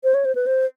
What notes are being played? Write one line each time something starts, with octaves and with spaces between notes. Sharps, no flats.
C5
C#5
C5
B4
C5